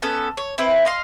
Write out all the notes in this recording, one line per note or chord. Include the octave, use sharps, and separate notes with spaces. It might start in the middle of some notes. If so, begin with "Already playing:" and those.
B3 C#4 A4
C#5
C4 E4 B4
D#5 F5 C6